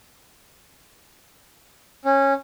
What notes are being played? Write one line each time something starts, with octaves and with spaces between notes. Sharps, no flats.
C#4